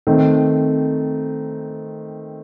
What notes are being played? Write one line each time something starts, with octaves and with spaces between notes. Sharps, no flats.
D#3 A3 C4